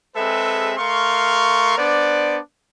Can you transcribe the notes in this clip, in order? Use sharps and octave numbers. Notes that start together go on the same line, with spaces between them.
G#3 C4 G#4 A4 B4 E5
A3 A#4 F5 C6 C#6
B3 D4 C5 D5